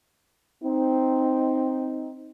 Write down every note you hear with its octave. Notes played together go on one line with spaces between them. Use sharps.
C4 D#4